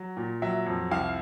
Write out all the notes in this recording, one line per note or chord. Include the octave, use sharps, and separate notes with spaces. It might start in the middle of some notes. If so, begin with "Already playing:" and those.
Already playing: F#3
A#2
F#3 E5
F2
C2 F5